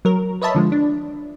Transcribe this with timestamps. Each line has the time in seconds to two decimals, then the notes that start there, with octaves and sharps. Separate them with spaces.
0.05 F#3 A#4
0.42 B4 C#5 D#5 E5 A5 B5
0.55 D3 F3 G#3
0.72 D4